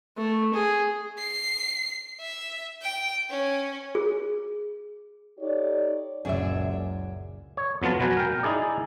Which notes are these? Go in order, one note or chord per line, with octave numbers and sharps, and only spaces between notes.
A3
G#4
C7
E5
G5
C#4
G#4
D#4 G4 A4 C#5 D5
F#1 C#2 F#2 A#2 C#4 G#4 D5 E5
C#5
F2 F#3 B3 F4 A5
B2 F#3 B4 G#5 A#5
A#4 G5
D#4 E4 G#4 D5